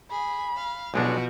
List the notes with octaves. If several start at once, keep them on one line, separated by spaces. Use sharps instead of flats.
G#4 B5
F5
B1 B2 F3 G#3 D4 F#4